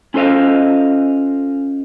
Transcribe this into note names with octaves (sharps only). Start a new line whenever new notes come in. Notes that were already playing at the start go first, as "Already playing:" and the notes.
C#4 F4 A4 C5 D#5 F5